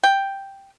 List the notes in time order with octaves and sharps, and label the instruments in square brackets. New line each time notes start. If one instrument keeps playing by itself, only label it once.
[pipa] G5